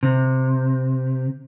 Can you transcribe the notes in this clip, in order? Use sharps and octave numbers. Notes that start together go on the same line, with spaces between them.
C3